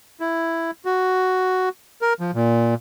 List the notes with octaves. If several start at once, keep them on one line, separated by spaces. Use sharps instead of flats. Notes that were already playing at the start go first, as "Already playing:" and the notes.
E4
F#4
A#4
F3
A#2